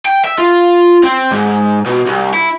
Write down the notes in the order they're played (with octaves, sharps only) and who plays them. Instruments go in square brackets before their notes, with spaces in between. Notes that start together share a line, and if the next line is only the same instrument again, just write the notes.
[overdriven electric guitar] G5
E5
F4
C4
G#2
B2
C2
E4